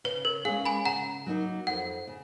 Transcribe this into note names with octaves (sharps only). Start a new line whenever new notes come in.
C#3 B4
A#4
G#3 C#4 G#4 F5
G#5 B5
C#3 F#5 A#5
F#3 A#3 D#4
F2 F#5
C#3